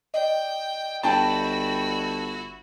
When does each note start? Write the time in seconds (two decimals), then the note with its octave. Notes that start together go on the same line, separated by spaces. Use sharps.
0.14 D5 D#5 G5
1.03 G1 E4 F#4 G5 A5